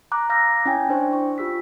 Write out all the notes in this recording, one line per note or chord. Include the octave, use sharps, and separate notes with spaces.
A#5 D6 F#6
F5 D6 E6 F6 G6 A#6
C#4 E4 G5 G#5
D4 C5 G5 C#6
C#6
F4 G4 E6 B6